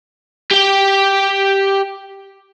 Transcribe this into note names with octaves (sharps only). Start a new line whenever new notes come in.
G4 G5